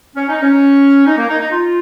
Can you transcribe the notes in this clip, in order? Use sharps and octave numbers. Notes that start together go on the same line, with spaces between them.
C#4
D#4
C#4
D#4
A#3
D#4
D#4
F4